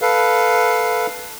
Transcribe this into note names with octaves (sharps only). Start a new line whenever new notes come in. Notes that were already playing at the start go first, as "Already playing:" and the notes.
A4 B4 F5